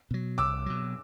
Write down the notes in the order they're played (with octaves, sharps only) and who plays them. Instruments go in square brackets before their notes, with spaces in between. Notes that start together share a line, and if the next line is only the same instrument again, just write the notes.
[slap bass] B2 F#3
[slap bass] C2 [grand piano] D6 E6
[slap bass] B2 F#3